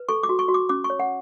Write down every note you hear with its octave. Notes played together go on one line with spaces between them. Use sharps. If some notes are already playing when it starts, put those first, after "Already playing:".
Already playing: B4
A4 C#6
D6
F#4
C#6
F#4
D6
C#4 D6
C#6
C#5
F#5